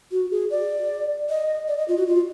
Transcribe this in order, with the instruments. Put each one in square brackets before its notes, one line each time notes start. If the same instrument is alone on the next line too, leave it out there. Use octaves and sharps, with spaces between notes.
[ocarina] F#4
G#4
D5
D#5
D5
D#5
F4
F#4
F4